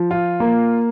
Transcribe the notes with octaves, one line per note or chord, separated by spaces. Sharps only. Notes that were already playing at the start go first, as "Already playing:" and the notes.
Already playing: F3
F4
A#3